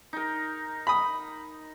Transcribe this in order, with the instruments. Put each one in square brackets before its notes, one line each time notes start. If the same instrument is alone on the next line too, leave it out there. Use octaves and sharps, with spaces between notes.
[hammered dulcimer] D#4 A#4
[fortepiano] B5 D#6